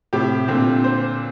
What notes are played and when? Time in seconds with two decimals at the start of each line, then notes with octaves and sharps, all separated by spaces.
0.13 A2 C3 G4
0.48 A#2 D3 C4
0.84 C5